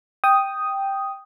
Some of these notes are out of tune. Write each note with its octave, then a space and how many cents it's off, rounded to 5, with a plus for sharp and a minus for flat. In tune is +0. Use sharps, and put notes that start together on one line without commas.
G5 +0 D#6 +0